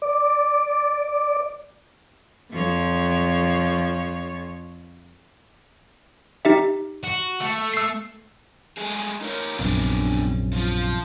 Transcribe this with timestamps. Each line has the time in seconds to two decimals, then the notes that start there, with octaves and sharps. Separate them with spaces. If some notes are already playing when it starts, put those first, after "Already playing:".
0.02 D5
2.51 F2 F3 C#5
6.45 D#4 G4 E5
7.03 F#4
7.40 A3
7.74 E6 C7
8.77 G#3 A3 G#4
9.21 D#4 A#4 C#5
9.59 A#1 F#2 C3 B3 D4
10.53 F3 F4